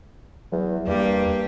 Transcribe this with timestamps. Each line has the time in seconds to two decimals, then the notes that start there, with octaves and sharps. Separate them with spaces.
0.52 E2 F#3
0.87 E2 G2 G3 A#3 G4